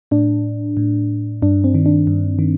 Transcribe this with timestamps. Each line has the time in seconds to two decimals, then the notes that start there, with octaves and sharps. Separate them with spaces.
0.11 A2 D4
0.77 A2
1.42 G2 D4
1.64 C4
1.75 D#3
1.86 D4
2.07 G2
2.39 D#3